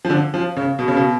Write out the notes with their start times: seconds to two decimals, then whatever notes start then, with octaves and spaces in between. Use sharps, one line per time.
0.05 F3
0.10 D3
0.34 F3
0.57 C#3
0.79 B2
0.88 C#3
0.97 B2